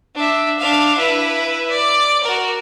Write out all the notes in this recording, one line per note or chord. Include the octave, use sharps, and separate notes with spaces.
D4 E5
D4 F5
E4 B4
D5
F#4 A#4